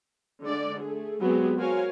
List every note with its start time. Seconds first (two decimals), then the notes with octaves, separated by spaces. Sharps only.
0.43 D3 G#3 D5
0.81 A3 G#4
1.21 F#3 G#3 B3 C4 G4 G#4
1.58 F#4 A#4 C5 C#5 F5 G#5